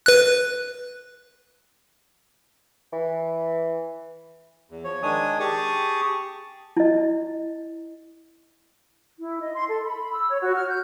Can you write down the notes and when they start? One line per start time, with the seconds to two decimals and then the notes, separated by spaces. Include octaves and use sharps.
0.06 B4 F#6
2.92 E3
4.71 E2
4.84 F3 C#5
5.03 D#3 G#3 D4 G#5 D#6
5.40 G4 G#4 A5 C#6 D#6
6.77 E4 D#5
9.20 E4
9.42 D#5
9.55 C6
9.69 A4
9.84 B5
10.00 B5
10.13 E6
10.30 C#5
10.41 F#4
10.57 F6
10.69 G6